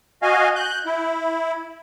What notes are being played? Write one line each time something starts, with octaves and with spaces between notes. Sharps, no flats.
F#4 D#5 F5 G#5
F#6 G6
E4